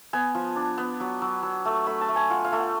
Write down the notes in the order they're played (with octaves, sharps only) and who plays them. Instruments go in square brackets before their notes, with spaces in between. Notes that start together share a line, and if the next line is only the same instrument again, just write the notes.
[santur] B3 G#5
F3
D4
B3
F#3
F#3
F#3
A3
A3 B5
A5
A3
G#5
F4 F#5
F5
A3
F#5